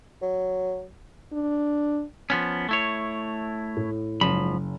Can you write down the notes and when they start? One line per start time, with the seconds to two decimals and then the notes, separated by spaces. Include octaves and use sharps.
0.22 F#3
1.33 D4
2.30 F3 B3 C#4
2.69 A3 E4 C#5
3.77 A2
4.21 F#1 G#2 F3 B5